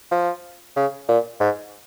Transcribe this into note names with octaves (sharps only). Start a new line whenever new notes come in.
F3
C#3
A#2
G#2